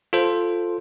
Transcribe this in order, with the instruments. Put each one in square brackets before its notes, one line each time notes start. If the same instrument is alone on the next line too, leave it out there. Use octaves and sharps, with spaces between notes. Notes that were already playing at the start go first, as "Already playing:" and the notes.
[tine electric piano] F4 A4 C5